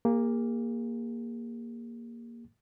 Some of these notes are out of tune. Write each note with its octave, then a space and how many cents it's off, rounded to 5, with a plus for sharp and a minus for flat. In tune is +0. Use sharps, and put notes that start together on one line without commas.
A#3 +5 G#4 -40